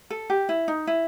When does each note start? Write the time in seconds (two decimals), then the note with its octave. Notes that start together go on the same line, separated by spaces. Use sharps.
0.10 A4
0.30 G4
0.49 E4
0.68 D#4
0.87 E4